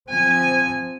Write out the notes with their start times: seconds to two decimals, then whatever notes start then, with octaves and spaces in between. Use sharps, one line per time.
0.10 F3 C4 G#5